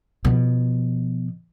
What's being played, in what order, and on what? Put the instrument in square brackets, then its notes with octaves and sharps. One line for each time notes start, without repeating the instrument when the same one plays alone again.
[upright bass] B2 F3